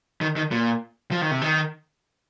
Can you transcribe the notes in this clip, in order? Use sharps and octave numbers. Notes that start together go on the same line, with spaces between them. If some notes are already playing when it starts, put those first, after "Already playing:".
D#3
D#3
A#2
F3
D#3
C3
D#3